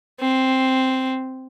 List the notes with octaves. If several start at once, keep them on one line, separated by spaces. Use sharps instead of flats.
C4